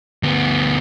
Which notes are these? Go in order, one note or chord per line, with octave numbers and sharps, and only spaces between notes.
D2 B3